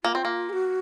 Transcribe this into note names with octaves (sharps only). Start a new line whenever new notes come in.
A#3 F4
C4
A#3
G#4
F#4